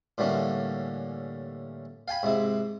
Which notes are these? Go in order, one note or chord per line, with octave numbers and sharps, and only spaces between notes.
A2 D3 E3 G3 A#3 C#4
F5 G5 G#5 B5
G#2 C3 E4